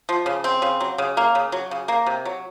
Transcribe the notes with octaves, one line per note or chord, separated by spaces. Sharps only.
F3
C#3
C4
C#3
F#3
C#3
A#3
C#3
F#3
C#3
A#3
C3
F#3